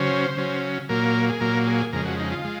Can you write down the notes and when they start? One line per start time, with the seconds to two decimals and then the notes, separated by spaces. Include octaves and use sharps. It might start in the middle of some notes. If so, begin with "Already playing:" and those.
Already playing: C#3 F#3 C#4 C5
0.37 C#3 F#3 C#4
0.89 A#2 F#3 A#3 A#4
1.29 G#4
1.40 A#2 F#3 A#3 A#4
1.67 G#4
1.93 F2 C#3 G#3 A#4
2.06 F#4
2.19 D#4
2.32 F4
2.45 G#3